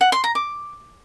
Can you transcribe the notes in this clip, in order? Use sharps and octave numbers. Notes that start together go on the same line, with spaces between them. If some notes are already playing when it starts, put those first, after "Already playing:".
F#5
C6
A#5
D6